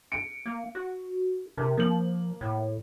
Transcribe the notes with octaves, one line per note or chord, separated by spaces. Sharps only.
C#7 D7
A#3
F#4
C3 A#4
F3 A#3 F#7
A2